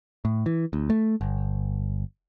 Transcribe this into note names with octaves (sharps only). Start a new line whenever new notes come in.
A2
E3
D2
A3
G1